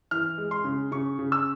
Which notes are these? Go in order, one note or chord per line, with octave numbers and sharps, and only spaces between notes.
E3 F6
G#3
C6
C#3
C#3 C#6
C#3
E6